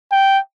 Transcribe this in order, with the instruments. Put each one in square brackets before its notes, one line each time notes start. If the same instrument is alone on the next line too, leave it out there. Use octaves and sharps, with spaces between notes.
[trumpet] G5